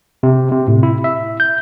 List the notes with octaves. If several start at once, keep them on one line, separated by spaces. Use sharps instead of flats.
C3
C3
A2
E4
E5
G6